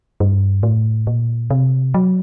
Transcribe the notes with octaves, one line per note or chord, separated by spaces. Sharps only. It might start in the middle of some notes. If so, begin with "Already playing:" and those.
G2
A2
A#2
C3
F#3